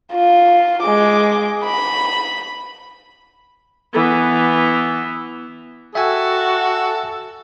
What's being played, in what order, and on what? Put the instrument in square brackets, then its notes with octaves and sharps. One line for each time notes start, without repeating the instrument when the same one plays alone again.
[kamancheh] F4
G#3 D6
B5
[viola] E3 B3
[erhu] F#4 [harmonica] A4 [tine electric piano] E5 G5 G#5